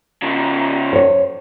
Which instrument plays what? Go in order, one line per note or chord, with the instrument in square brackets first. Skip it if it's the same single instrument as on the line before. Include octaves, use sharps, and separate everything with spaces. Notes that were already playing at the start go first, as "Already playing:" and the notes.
[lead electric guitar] C#3 F3
[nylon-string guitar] C5 C#5